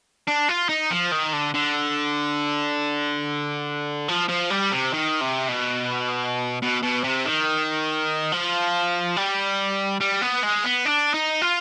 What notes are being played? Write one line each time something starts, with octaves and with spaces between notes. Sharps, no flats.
D4
F4
D#4
F3
D#3
D3
D3
F3
F3
G3
C3
D#3
C3
B2
B2
B2
C3
D#3
F3
G3
G3
B3
G#3
B3
D4
D#4
F4